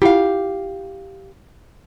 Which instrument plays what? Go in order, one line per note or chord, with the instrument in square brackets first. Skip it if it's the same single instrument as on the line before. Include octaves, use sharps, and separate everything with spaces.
[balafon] E4 F4 F#5 [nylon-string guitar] G4 F5